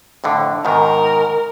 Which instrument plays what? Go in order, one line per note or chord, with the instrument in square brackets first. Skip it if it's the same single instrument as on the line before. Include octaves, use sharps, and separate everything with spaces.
[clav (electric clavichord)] F2 A2 D3
[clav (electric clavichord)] G#2 B2 D#3 [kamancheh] A#4